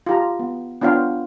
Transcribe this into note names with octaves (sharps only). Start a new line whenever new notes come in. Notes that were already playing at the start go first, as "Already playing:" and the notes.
F4 G4 A#5
B3
B3 D4 F4 C#5 F5 G5